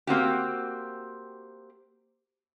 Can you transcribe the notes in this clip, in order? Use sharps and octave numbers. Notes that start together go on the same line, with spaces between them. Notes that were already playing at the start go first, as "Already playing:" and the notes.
A#3 C4 F#4 G4